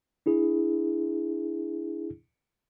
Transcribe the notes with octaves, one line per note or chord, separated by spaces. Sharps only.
D4 E4 G#4